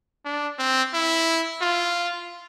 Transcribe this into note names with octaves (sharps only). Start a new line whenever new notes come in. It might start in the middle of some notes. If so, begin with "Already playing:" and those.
D4
C4
E4
F4